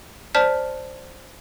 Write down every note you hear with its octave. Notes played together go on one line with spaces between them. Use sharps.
C5 D5 A5 F6 G6 B6